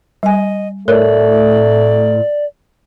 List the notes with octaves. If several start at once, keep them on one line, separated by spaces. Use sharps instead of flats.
G3 D#5 G#5
A2 A3 A#4 C#5 D5